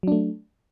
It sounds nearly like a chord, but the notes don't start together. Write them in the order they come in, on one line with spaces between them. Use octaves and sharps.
F#3 D4 A3